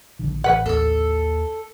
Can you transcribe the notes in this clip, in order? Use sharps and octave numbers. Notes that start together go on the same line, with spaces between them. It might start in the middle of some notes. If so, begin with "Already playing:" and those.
A#1 D3 D#3
A1 B4 F#5
D#2 A4 E6